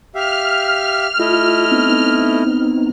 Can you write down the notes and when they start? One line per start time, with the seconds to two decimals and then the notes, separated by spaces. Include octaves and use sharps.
0.15 G4 E5 F5 F6
1.20 A3 E4 F4 D#5
1.71 B3 C4 D#4